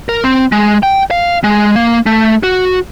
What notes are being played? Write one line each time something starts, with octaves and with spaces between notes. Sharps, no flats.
A#4
C4
G#3
G5
F5
G#3
A#3
A3
F#4